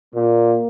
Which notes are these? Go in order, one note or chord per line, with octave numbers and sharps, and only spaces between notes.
A#2 A#3